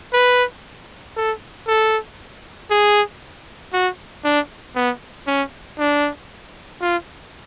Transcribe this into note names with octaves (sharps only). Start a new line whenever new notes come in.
B4
A4
A4
G#4
F#4
D4
B3
C#4
D4
F4